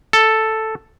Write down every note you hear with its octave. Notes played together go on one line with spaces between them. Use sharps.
A4